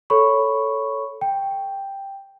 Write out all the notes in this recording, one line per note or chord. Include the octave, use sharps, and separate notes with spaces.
A4 C#5 B5 C#6
G5